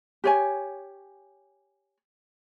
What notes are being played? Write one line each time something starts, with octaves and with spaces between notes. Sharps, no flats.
G4 C#5 G#5